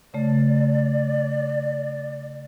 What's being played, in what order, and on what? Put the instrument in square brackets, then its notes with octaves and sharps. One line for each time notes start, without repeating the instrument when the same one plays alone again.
[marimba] C#3 A3 [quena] D5